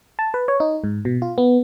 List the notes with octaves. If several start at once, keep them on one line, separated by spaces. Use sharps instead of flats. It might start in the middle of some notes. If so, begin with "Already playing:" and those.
A5
B4
C#5
D#4
G#2
B2
F4
B3